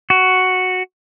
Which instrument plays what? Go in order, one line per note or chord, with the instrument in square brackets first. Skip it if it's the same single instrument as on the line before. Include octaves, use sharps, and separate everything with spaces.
[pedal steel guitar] F#4